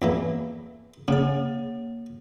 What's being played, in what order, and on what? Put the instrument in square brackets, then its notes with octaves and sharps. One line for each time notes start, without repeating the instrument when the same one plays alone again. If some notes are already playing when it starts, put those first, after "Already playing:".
[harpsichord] E2 E3 A#3
[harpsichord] C#3 [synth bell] A#3 C#5